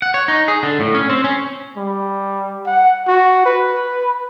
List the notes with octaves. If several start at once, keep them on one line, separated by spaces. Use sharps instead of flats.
F#5
C#5
D#4
G#4
D3
A2
C#4
C4
C#4
G3
F#5
F#4
B4